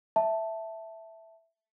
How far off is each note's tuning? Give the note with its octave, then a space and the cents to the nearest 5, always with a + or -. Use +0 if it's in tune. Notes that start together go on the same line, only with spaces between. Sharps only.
E5 +0 A5 +0